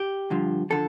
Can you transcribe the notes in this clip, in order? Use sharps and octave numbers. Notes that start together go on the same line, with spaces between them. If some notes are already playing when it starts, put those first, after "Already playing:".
Already playing: G4
G2 D3 F3
D3 F3 A4